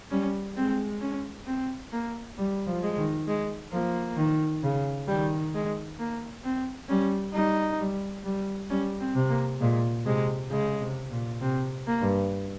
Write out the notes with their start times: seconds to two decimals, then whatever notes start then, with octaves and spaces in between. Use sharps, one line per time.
0.11 G3 C#4
0.57 G#3 C4
1.01 C#4
1.47 C4
1.92 A#3
2.38 G3
2.67 F3
2.82 G#3
2.97 D#3
3.28 G#3
3.72 F3 A#3
4.17 D#3
4.63 C#3
5.08 D#3 G3
5.54 G#3
5.99 A#3
6.44 C4
6.89 G3 C#4
7.34 G3 D#4
7.79 G3
8.24 G3
8.70 G3 C#4
9.00 C4
9.15 C3
9.30 A#3
9.61 A#2 G#3
10.05 C3 G#3
10.50 C#3 G#3
10.81 C3
11.11 A#2
11.41 C3 C4
11.87 A#3
12.01 G2